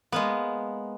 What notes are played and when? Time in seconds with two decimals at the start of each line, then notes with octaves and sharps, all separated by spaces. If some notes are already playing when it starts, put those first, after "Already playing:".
0.12 G#3 A#3 B3